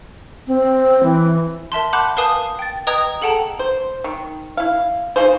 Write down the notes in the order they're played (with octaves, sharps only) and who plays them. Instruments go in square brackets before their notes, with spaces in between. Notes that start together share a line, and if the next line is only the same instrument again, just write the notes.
[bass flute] C4
E3
[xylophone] A#4 E5 A5 C6
F#5 A5 B5 D6 F#6 G6
A#4 B4 F5 G#5 A5 D#6
G5 A6
B4 D#5 G5 A#5 D#6 G#6
G#4 A4 F#5 G5 A5 A#5
[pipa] C5
D#3
E4 F5
D#4 F4 G#4 C5